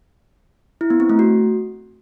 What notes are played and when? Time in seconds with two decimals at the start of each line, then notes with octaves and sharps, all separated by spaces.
0.81 E4
0.90 B3
1.00 C4
1.10 A3
1.19 F#4